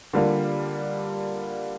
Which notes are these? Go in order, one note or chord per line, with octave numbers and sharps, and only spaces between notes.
D3 G3 A#3 F4